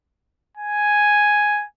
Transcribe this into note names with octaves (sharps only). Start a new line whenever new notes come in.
G#5